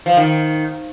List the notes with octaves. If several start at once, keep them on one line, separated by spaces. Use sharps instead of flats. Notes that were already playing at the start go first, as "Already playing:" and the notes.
F3
D#3